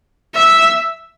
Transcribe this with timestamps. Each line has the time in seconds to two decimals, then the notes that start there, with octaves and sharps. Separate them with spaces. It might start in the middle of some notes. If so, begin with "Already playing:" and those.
0.35 E5